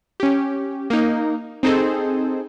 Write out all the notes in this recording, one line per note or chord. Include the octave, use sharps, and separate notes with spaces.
C#4 G4
A#3 D#4
C4 D#4 G#4 A4 C5